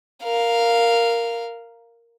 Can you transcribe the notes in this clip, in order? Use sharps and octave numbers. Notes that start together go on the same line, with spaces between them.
A#4 F5